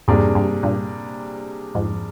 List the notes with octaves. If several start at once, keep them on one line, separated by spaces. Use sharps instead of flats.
F2 G#2 C3 G3 A#3 D4 G#4
G2
G2 A#2
F2 G#2